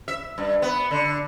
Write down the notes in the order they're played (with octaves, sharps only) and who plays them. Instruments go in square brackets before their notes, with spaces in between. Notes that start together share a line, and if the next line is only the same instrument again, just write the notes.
[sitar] E5
G2
B3
D3